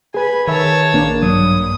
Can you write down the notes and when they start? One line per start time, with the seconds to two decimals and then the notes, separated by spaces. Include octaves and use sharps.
0.14 G#4 B4 G#5 B5
0.47 D#3 A#4 C#5 E5 A5
0.93 A#1 A#3 D4
1.23 G2 F#3 D#6